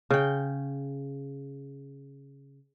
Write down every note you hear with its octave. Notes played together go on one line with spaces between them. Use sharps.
C#3 G5